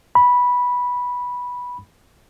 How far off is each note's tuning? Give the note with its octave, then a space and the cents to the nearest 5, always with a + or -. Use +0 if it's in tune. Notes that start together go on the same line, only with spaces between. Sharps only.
B5 -10